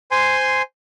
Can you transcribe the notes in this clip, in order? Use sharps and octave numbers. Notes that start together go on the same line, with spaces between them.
C5 G#5 C6